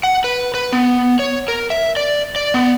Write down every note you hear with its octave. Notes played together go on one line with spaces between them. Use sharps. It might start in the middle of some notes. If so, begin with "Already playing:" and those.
F#5
B4
B4
B3
C#5
A#4
E5
D5
D5
B3